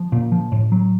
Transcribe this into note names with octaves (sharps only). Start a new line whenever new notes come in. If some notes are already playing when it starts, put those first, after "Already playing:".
Already playing: F3
A#2
F3
A2
F#3